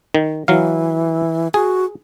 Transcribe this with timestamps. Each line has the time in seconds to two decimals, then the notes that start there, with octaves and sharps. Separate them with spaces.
0.15 D#3
0.48 E3 F#3 F5
1.54 F#4 G#4